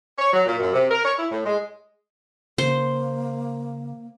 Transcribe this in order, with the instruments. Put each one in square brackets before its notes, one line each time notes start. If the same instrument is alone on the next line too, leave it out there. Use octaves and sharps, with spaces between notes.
[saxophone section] C#5
F#3
A#2
F#2
C3
A#4
C#5
E4
A2
G#3
[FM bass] C#3 [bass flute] A#3 [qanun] C5